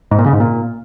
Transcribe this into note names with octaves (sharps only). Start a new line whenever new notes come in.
G#2
A#2
C#3
G#2
A#2